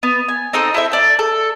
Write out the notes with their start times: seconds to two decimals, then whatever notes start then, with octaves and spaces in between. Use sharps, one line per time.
0.03 B3
0.28 G#5
0.53 C4 D#4 A4 D#6
0.74 E4 A4 C5 E5
0.92 A4 D5
1.19 A4